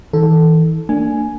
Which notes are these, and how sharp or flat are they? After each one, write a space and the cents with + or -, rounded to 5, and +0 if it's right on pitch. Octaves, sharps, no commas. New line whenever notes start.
E3 -45 A4 +0
A#3 -35 D4 -5 G#5 +5